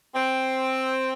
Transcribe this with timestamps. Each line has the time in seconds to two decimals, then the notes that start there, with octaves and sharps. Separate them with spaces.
0.15 C4